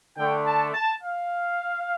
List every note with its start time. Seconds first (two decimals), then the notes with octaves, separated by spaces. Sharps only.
0.18 D3 A3 G5
0.46 A5
0.74 A5
1.02 F5